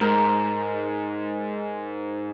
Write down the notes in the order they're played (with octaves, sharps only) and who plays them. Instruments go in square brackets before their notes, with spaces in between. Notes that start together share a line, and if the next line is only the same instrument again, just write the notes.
[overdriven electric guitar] G#2 [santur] A#4